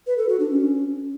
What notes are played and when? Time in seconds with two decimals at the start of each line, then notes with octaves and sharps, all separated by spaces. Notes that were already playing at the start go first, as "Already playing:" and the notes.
0.07 B4
0.18 A4
0.29 F#4
0.40 D4
0.51 C#4